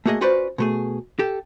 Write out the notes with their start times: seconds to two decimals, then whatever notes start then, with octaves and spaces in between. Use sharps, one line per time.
0.06 A3 A#3 F#4 G#4 D#5
0.21 C#4 F4 F#4 B4 C5 D5
0.58 B2 A3 G#4
1.19 G4 A4